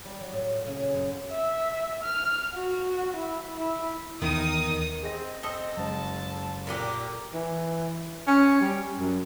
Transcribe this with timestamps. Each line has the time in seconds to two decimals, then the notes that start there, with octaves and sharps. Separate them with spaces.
0.05 G3
0.21 F#3
0.32 A2
0.52 A#2
0.66 C#3
0.80 G#4
0.94 F#2
1.31 E5
2.03 F6
2.55 F#4
3.16 E4
3.57 E4
4.22 D#2 D#3 E3 B3 D#4 D#6
5.03 C4 G#4 D#5 A#6
5.43 C4 A4 D#5 G7
5.77 F#1 G#3 A5
6.67 A#2 D3 G4 A#4
7.33 E3
8.27 C#4
8.61 G3
8.99 F#2